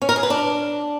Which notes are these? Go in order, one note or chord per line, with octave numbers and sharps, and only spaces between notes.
C#4
A#4
G#4
B4
D4